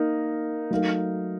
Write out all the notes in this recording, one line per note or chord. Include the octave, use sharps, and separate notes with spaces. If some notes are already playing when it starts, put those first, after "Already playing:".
Already playing: A#3 D#4 A#4
F#3 A3 D#4 A#4 F5